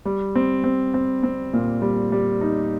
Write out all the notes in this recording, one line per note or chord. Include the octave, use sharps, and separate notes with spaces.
G3
C4
C4
C4
C4
A#2
G3
G3
D#4